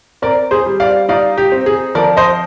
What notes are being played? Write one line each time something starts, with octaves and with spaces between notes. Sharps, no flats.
C4 A#4 D5
G#4 C5
G3
D5 F5
D#4 D5 F5
G4
C4
G#4
F3 A#4 D5
C5 D#5